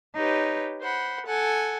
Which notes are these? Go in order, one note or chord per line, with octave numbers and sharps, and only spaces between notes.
D#4 G4 B4 C#5
C5 F#5 B5
A4 F#5 G#5